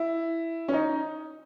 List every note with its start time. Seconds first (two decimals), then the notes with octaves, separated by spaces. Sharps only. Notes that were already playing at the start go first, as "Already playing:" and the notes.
Already playing: E4
0.68 C#4
0.73 D#4